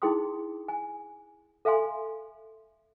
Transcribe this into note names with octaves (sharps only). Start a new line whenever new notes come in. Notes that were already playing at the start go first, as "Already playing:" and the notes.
D#4 E4 G#4 G5 C6 D#6
G#5
A4 E5 F5 G#5 C6